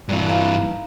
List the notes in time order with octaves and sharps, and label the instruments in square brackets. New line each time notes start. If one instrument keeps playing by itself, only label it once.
[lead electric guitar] G2 E3 [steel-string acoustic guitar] A#2
[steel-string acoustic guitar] D#4 F5 A#5